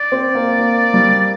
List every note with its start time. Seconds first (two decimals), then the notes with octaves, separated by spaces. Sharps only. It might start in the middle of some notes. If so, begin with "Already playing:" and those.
Already playing: D5
0.12 C4
0.35 A#3
0.59 A#3
0.94 G3